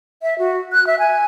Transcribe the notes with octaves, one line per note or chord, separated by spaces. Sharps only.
E5
F#4
F#6
E5
G#5